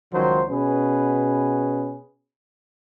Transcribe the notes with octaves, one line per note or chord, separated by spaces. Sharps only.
C#2 D#3 F3 F#3 C5
B2 C#4 G#4 B4